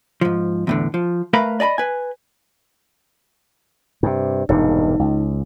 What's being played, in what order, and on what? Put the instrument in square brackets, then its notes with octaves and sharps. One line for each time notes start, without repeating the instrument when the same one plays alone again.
[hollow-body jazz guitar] G#2 F3
E2 A2 D3
F3
A3 A#4 B4 F5 A#5 B5
D5 D#5 A5 B5
B4 G#5
[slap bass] G2 C3
[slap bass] E1 G2 A#2 [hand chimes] D#4
[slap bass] C#2